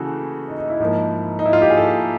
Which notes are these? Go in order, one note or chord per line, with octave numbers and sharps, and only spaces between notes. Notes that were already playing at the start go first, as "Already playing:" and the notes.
Already playing: C#3 E3 A3 F#4 G#4 A4
D#4
D#4
E4
G#2 F3 A#3
D#4
E4
F4
G4
G#4
A4